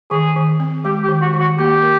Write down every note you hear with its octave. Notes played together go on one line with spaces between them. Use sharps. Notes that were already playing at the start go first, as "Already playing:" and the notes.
D#3 G#4
D#3
C4
G#3 G4
G4
D#3
F#4
D#3
F#4
A#3 G4
A#4